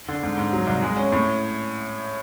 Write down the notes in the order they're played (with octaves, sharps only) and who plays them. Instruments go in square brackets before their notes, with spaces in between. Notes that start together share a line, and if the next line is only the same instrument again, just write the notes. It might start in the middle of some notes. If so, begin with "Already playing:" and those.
[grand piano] D3
G#2
G#2
F#3
C2
G#3
C#4
A2